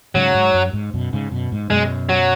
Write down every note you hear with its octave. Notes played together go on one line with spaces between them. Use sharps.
G#2 C#3 F#3
G#2
F#2
G#2
F#2 B2
G#2 C#3
F#2 B2
G#2
F#2 B2 G#3
F#3